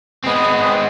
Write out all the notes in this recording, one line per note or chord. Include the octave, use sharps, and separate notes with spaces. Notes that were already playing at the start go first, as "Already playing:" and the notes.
G#3 B3 C4